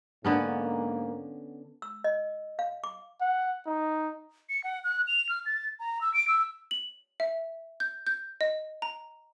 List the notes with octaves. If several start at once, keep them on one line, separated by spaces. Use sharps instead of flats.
G#2 D3 A#3 B3 C#4
E6
D#5
F5
D6
F#5
D#4
C#7
F#5
F#6
F7
F6
A6
A#5
E6
D7
E6
F#7
E5
G6
G6
D#5
A#5